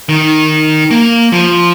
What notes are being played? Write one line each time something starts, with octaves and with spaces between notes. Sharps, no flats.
D#3
A#3
F3